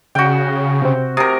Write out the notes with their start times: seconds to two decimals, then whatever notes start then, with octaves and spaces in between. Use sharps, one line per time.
0.15 C#3 F#4 G5
0.82 C3 C4
1.17 C3 A#4 D#6